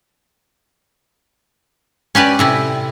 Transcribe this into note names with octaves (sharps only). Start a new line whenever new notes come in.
C#4 G4 B4 D5
A2 C3 E4